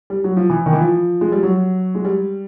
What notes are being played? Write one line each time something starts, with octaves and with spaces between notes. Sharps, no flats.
G3
F#3
F3
E3
D#3
E3
F3
G#3
G3
F#3
G#3
G3